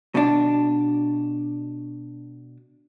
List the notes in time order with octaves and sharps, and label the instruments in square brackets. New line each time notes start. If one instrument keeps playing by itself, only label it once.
[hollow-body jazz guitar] B2 D4